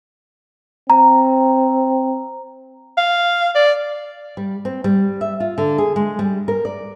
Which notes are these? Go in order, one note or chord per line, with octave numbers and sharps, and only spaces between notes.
C4 A#5
F5
D5
G3
C4
G3
E5
F4
D3
G#4
G#3
G3
A#4
D5